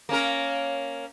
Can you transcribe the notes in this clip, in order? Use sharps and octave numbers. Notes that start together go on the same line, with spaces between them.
A#3 C#4 A#4